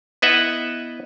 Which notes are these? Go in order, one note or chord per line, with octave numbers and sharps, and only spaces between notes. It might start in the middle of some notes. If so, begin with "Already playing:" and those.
B3 E4 B4 D#5 E5 F#5